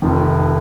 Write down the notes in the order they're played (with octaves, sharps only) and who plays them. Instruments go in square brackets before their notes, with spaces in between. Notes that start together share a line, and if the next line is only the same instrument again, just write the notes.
[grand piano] F1 F2 D#3